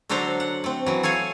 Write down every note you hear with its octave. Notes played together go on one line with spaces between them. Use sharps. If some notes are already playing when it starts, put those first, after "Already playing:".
D3 F#3 D4 A4 C5 A#5
F#5
A3 C4
E3 F#3
A4 C#5 F5 G#5